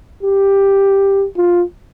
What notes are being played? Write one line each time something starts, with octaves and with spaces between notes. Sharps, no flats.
G4
F4